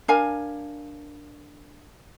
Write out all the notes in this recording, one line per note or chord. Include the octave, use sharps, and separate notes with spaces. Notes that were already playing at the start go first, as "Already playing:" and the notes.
D4 A#4 F5 G#5